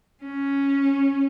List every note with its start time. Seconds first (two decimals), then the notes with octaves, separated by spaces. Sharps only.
0.24 C#4